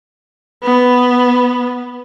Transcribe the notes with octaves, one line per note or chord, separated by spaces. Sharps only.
B3